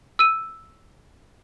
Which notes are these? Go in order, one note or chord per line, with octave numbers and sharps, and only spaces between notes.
E6 D#7